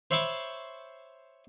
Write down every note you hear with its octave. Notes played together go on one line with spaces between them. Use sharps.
C5 C#5 E5 B5 C#6 D6